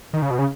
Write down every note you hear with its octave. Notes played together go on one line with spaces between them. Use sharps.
D#3
C#3
B2
C#3